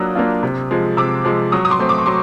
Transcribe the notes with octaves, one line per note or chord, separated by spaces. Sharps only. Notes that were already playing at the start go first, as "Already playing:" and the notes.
Already playing: F#3 A#3 D4 F4 D#6 E6 F#6
A#3 D4 F4
C3
F3 G#3
C3 D6 E6
F3 G#3
F#3 C#6 D#6
D#6
C6 D6
A3 C4
D6
C#6
F#3 C6 D6